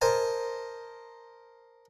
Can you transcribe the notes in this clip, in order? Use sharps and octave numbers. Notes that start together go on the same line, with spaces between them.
A#4 C5 D#5 G#5 A5